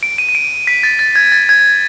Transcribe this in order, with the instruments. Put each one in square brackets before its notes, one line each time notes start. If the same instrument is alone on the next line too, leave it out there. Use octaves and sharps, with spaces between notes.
[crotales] D7
D#7
D#7
D7
B6
A6
A6
G#6
A6
G#6